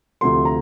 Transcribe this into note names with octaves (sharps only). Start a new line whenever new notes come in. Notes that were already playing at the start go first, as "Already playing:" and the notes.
D2 C3 F3 C6
A#5